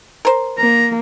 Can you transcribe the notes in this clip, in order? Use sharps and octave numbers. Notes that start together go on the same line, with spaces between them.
A#4 C5
A#3 A#5